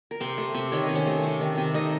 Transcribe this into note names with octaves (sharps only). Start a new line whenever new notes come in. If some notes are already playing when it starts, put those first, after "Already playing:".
A#4
C3 C4 C5
A3
C3
D#3 C#5
D#5
C3
C#4 C#5
A3
C3
D#3
C3
A3 D#4 D#5